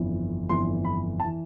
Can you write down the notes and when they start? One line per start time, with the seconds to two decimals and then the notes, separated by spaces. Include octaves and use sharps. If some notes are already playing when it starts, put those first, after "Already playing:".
Already playing: G1 F2 E3
0.49 G1 F2 E3 C6
0.85 B5
1.20 A5
1.24 E3